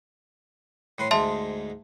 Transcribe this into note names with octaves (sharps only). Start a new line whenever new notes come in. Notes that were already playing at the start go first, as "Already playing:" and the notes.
A2 B4 C6
D2 G#2 G#3 E5 A5 C6